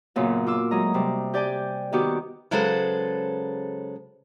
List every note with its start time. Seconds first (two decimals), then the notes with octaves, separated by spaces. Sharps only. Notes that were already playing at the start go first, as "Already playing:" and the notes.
0.16 F#2 A#2 C#3 B3
0.46 F4 D6 E6
0.71 D2 F#3 G#3 D#5 A#5
0.94 C3 G3
1.34 G4 D5 G5 G#5
1.92 D#3 B3 F#4 G4 D6
2.51 C#3 F#3 G#3 A4 B4 C5